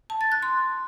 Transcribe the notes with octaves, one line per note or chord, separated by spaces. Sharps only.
A5
A6
F#6
C6